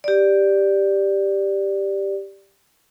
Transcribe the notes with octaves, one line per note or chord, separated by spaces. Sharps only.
G4 D5